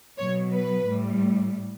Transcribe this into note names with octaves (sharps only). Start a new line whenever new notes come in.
B2 F#3 C#5
B4
A2 G3